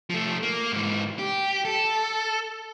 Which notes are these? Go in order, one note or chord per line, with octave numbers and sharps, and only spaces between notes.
F3 A3
A#3
G#2 E3
G4
A4